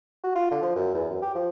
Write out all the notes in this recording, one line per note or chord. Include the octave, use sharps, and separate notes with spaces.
F#4
F4
D3
F3
F#2
E2
F#2
G4
F3